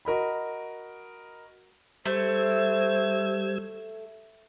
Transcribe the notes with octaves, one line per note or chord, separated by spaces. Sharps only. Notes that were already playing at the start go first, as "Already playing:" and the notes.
F#4 A#4 D#5 B5
G3 A3 C5 E6 G#6